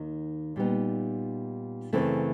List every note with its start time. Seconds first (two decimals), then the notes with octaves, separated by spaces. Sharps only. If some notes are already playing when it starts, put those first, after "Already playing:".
Already playing: D#2 D#3
0.56 A#2 G3 B3 D#4
1.93 F#2 C#3 E3 A3 C4